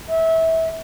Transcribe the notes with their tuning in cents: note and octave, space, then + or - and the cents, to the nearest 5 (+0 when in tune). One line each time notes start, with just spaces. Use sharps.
E5 -25